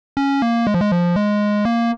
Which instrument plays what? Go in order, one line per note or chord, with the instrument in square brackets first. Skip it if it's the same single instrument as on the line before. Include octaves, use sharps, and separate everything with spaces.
[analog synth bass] C#4
A#3
G#3
F3
G#3
F3
G#3
A#3